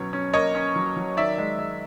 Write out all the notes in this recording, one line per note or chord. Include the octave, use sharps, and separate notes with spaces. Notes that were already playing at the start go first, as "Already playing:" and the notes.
Already playing: B2 F#3 C#4 C#5
C#4
A#3 C#5 D#5
C#4
F#3
F#3
D#3 D5 E5
G#3
G#3